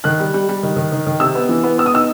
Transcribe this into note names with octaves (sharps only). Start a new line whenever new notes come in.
D#3 F#6
G3
G3
G3
D#3
D#3
D#3
D#3
C3 E6
B3
E3
B3
B3 E6
D#6
D#4 E6